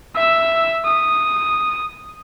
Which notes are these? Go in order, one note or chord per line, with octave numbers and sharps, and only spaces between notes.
E5 E6
D#6